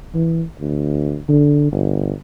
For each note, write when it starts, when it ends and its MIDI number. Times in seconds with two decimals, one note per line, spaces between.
0.14 0.43 52
0.60 1.20 38
1.29 1.70 50
1.72 2.12 31